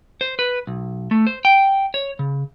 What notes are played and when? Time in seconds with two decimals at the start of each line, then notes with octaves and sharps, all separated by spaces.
0.21 C5
0.39 B4
0.67 B1
1.11 A3
1.27 C5
1.45 G5
1.94 C#5
2.19 C#3